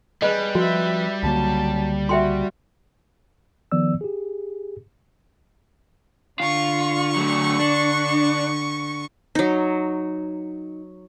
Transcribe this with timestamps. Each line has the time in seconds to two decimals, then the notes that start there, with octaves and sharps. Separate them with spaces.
0.22 G3 G#4 B4 D#5
0.55 F3 F#4 B4 E5
1.23 C#2 D3 F#3 A#3 A5
2.09 F#4 E5 G5 C6
3.72 D#3 F3 B3 D5 E6
4.01 G4 G#4
6.40 D3 F4 C#6
7.16 F#3 A3
7.59 D4
9.35 F#3 D#4